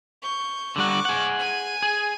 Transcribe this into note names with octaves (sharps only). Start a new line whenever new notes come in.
C#6 G6
D3 G3 F#5 C#6 D6
G#4 F#5
G#5 D#7
G#4